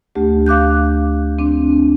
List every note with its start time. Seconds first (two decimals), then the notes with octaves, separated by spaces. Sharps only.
0.15 D2 A3 G4
0.46 F5 D6 F#6 G6
1.39 C4 D4